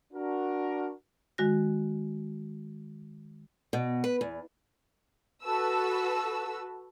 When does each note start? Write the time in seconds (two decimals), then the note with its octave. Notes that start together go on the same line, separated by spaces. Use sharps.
0.13 D4 F#4 A#4
1.38 D#3 G#3 F#4 A#6
3.73 B2
4.04 B4
4.21 E2
5.43 F#4 A4 B4 E6